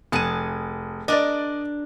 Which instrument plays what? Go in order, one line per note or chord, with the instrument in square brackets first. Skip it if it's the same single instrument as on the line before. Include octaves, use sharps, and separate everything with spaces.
[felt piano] F1 D#7 [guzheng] G#4 F#5 A5
[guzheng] D4 A#4 [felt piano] D5 D#5